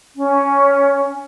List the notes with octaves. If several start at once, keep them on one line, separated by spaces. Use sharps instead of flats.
C#4